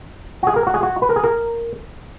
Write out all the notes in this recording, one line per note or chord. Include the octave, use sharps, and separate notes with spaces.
F#4
G#4
A#4
F#4
G#4
F#4
B4
A#4
G#4
A#4